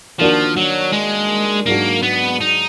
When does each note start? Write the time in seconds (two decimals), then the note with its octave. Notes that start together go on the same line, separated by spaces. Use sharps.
0.19 D#3 F3 A#3 D4 F#4
0.57 F#3
0.93 G#3
1.66 G#2 F#3 A#3 D4 F#4
2.03 B3
2.41 D#4